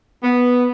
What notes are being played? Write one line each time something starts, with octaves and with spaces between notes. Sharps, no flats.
B3